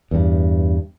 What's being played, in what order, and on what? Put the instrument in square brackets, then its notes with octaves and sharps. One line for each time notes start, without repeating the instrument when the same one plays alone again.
[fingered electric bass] E2 G2